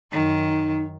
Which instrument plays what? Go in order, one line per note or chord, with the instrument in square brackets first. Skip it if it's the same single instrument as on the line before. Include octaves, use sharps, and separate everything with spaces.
[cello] F#2 D#3 [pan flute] D#4